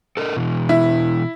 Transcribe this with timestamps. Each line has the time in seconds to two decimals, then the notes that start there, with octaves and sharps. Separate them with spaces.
0.17 A4 A#4 D#5
0.37 B2 E3
0.69 E4